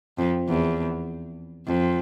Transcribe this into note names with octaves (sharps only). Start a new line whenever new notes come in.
F2
E2
F2